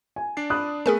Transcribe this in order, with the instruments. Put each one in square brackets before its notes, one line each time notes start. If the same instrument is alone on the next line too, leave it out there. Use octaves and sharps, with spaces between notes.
[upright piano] G#5
[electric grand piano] D4 D5 C7
[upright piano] B5 D#6 F#6
[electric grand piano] A3 B4 [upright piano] B3 [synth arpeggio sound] G#4 A#4 G#5